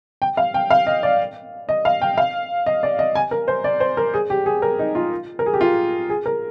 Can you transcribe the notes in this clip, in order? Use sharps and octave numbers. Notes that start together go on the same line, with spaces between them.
G5
F5
G5
F5
D#5
D5
D#5
F5
G5
F5
D#5
D5
D#5
G#5
A#4
C5
D5
C5
A#4
G#4
G4
G#4
A#4
D#4
F4
A#4
G#4
G4
F4
G#4
A#4